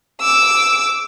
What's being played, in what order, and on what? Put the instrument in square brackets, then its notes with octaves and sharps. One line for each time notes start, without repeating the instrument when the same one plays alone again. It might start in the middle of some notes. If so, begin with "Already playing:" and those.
[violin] D6 E6